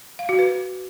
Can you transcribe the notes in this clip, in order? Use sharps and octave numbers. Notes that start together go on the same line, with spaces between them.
F5
F#4
B4